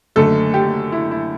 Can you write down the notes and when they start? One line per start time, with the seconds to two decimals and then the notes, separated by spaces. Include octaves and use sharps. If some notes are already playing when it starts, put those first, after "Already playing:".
0.16 F#1 F#2 D3 A3 A4
0.54 G4
0.92 E4
1.11 E4